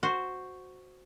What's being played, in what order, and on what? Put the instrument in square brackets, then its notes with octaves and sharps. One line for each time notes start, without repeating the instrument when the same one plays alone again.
[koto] F#4 C5